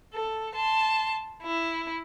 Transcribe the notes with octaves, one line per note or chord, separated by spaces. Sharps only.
A4
A5 C6
E4